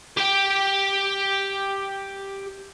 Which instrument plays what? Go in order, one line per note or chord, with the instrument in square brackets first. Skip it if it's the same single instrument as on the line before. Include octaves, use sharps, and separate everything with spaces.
[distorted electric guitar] G4 G5